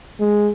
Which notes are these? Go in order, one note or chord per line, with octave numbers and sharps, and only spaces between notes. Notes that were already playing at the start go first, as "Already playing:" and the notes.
G#3